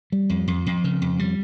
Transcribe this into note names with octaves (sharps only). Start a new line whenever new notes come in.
G3
F2
F2
F2
C#3
F2
G3